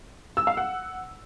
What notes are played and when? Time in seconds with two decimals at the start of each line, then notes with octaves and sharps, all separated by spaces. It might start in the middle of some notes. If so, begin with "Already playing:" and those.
0.37 E6
0.47 F5
0.57 F#5